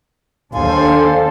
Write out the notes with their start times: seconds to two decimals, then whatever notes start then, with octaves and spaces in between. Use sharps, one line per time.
0.54 D#2 D4 A4 C5 F5 G#5 C6